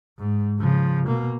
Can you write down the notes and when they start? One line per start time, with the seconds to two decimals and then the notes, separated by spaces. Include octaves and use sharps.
0.19 G#2
0.59 C#3 F3
1.07 B2 A#3